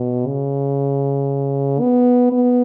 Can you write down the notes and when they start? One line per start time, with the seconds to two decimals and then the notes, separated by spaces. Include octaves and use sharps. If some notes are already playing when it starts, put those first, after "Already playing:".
Already playing: B2
0.26 C#3
1.80 B3
2.32 B3